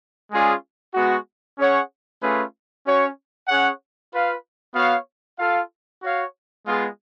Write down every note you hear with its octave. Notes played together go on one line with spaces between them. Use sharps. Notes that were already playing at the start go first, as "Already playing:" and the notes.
G#3 C#4 F4 G#4 D5
G#3 B3 F#4
C#4 G#4 C#5 F#5
A3 C#4 F4 G#4 B4
C#4 F#4 C#5
C#4 G#4 C#5 F#5
F4 B4 F5
B3 F#4 C#5 F5
F4 A4 F5
F#4 C#5 F5
G#3 B3 F4 G#4